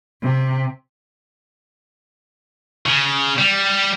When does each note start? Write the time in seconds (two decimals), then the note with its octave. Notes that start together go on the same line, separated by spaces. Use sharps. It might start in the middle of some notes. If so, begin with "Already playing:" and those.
0.22 C3
2.86 C#3
3.38 G3